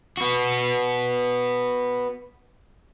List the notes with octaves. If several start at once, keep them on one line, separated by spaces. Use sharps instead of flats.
B3 F#4